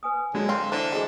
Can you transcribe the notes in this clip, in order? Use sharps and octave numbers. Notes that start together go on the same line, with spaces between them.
B4 G#5 D#6
D3 F#3 G#3
C4 F5
D3 E3 C5
E3 G#3 F#4 G#4